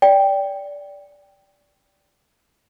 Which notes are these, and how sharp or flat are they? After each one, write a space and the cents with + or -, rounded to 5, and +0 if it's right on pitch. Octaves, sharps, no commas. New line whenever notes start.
D5 -20 G5 +0